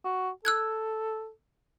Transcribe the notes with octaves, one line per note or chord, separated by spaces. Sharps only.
F#4
A4 E6 F#6 G#6